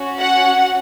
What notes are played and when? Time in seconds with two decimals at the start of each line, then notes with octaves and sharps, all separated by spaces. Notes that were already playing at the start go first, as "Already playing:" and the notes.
Already playing: C#4 F#4
0.20 F#5